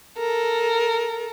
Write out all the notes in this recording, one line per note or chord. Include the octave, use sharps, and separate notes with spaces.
A4 A#4